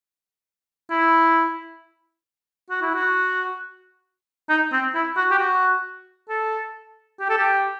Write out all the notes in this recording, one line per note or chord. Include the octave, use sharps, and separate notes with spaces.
E4
F#4
E4
F#4
D#4
C4
E4
F#4
G4
F#4
A4
G4
A4
G4